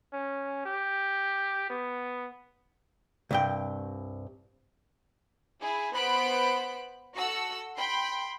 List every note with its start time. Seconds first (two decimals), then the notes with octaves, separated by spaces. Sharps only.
0.13 C#4
0.65 G4
1.70 B3
3.31 C2 G2 G5
5.62 E4 G#4
5.94 B3 C5 B5 F#6 D7
7.17 F#4 A4 F#5 E6
7.78 G5 B5 C6